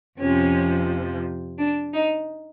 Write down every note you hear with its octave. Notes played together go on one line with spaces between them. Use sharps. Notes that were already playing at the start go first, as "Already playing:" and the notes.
F2 C3 F3 C#4
D4
D#4